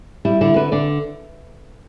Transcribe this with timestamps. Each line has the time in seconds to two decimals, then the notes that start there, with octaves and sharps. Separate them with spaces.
0.25 G3 E4
0.41 D3 E4
0.56 D3 B4
0.72 D3 D5